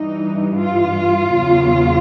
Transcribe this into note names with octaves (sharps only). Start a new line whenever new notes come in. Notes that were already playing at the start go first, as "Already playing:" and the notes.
Already playing: G2 E3 G3 D#4
F4
E2 C#3 F#3